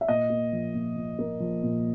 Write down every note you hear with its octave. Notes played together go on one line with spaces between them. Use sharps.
E5
A#2 D#5
A#3
F3
A#2
A#2
A#3
F3
A#2